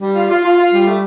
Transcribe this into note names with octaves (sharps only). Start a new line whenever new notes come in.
G3
F4
F4
F4
F4
G3
A3